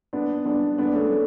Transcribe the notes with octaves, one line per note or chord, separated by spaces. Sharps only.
B3 D4
B3 D4
B3 D4
A3 C#4
A3